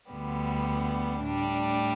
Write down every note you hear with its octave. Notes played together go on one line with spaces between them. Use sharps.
D2 D3 G3 B3
A2 G3 D4